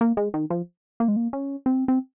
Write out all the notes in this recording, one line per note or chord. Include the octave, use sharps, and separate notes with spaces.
A#3
G#3
D#3
F3
A#3
G#3
A#3
C#4
C4
C4